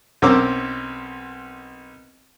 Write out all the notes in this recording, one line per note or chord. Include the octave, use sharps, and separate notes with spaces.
B1 C4 C#4 A#4 D6 E6